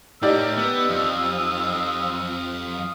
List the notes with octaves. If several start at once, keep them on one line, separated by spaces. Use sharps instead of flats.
A2 D#4 G4 A#4 D5 E6
B3
F2 F5 D#6